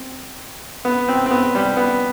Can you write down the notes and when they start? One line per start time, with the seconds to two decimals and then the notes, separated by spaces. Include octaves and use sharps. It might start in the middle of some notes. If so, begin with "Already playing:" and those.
Already playing: C4
0.85 B3
1.09 C4
1.26 C4
1.31 B3
1.55 G3
1.77 B3